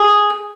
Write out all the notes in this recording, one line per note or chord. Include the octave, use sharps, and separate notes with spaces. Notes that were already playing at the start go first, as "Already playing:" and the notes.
Already playing: G#4